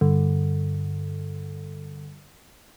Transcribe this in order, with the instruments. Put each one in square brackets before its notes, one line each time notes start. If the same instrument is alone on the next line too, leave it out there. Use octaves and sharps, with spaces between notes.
[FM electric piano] G2 [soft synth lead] D3